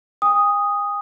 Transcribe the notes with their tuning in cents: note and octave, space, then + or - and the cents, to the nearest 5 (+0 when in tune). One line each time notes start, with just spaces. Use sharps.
G#5 -45 D#6 +0